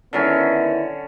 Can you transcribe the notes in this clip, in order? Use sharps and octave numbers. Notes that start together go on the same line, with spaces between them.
D3 D#3 F#3 B3 C#4 E4